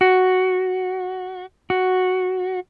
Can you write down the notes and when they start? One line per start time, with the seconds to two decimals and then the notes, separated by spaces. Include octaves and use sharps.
0.01 F#4
1.70 F#4